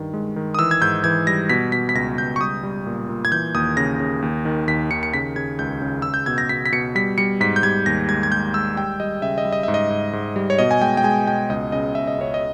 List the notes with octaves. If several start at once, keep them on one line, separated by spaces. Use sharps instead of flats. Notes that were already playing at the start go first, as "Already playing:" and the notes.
Already playing: G2 D#3
G#3
D#3
D#6
E3 E6
G#6
G#2 G6
E3 G#6
G3 A#6
B2 B6
B2 B6
B6
C#2 A#6
C#2 G6
C#6
G3 D#6
G3
A#2
A#2
G#6
E3 G6
D#2 D#6
C#3 A#6
C#3
D#2
D#3
D#2 B6
D#3 C#7
C#7
C#3 B6
C#3 G#6
C#2 G6
C#3
C#2 E6
G6
B2 G#6
A#6
B2 B6
B6
B2 C#7
G3 B6
G3 C#7
G#2 B6
G6
G3 G#6
D#2 A#6
G#3 G#6
G#6
G#3 G6
G#3 E6
G3 G5
G3 D#5
C#3 E5
D#5
G3
D#5
G#2 E5
D#5
G#2
G#2
G3
C#5
B2 D#5
G#5
G#3 G5
G5
G#3 G#5
B2 G5
C#2 D#5
C#3 D#5
C#2 E5
D#5
C#2 C#5
D#5